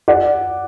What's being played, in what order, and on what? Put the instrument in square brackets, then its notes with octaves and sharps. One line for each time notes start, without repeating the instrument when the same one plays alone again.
[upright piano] D5 F#5